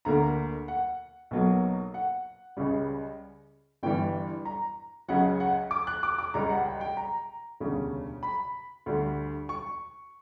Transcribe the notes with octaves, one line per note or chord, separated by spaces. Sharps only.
D2 D3 A#3 A#5
F#5
B1 B2 F#3 A#3
F#5
C#2 C#3 G3
G1 G2 E3 G3 G5
A#5
C#2 C#3 F#3 F#5
F#5
D6
F#6
D6
D6
C#2 C#3 G3 A#5
F#5
G5
G5
A#5
E1 D2 C#3 G3
B5
D2 D3 G3
C#6